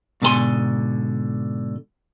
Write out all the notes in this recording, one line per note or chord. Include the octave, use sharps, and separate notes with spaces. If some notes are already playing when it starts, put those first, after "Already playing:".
G#2 B2 D3 A4 G#5 C6